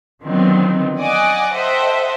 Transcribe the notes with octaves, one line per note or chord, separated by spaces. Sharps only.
D3 D#3 F3 F#3 B3 C4
D5 D#5 F#5 G#5 C#6 D6
A4 C5 D#5 E5 F#5 G5